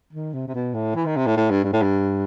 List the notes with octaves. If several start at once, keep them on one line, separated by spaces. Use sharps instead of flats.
D#3
C3
C3
B2
A2
E3
D#3
C3
A2
A2
G2
G2
A2
G2